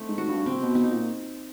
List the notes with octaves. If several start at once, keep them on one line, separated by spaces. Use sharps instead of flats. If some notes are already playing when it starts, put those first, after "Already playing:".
Already playing: A3 C4 D#4
G#2
F#4
G2
C3 C4
B2
B2 D#4
A#2